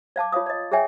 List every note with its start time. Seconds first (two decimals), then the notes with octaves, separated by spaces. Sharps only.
0.16 D5 F5 A5 D6
0.32 F4 C#5 F5 D#6
0.46 D5 D#5
0.72 G#4 C#5 E5 G5 G#5